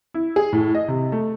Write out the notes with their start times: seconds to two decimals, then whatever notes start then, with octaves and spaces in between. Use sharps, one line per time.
0.14 E4
0.36 G#4
0.53 A2
0.75 D#5
0.88 C3
1.12 A3